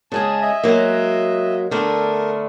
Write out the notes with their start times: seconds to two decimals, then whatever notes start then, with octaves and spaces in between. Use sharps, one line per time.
0.12 C#3 G#3 G#4 A5
0.41 D#5 E5
0.64 F#3 G#3 A#3
1.71 D3 A3 B3 A#4